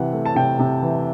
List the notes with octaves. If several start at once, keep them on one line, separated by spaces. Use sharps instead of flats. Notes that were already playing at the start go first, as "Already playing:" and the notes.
Already playing: C3 E3 F#5
A3
A5
C3 G5
C3
E3